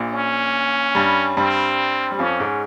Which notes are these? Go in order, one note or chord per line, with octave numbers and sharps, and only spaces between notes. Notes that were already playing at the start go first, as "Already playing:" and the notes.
Already playing: A#1 A#2
C#4
G2 G3
G2 G3 C4
G3
F2 F3 C#4
G#2 G#3